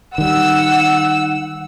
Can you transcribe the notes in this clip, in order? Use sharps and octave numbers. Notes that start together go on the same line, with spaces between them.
D#3 G3 F#5 E6